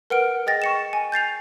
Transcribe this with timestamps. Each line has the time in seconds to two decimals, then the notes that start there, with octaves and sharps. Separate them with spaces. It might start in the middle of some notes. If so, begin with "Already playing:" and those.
0.10 A#4 B4 F#5 F6 D7
0.46 G#4 D#5 G5 A6 A#6
0.62 C#6 C#7 E7
0.93 G#5
1.12 G6 A6 C7 F7